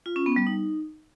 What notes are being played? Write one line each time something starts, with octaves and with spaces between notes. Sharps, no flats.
F4
C#4
B3
G3
D#4